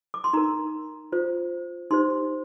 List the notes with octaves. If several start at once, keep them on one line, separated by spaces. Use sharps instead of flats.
D6
C6
D#4 A#4 A#5
F4 C5
D#4 G4 C5 C6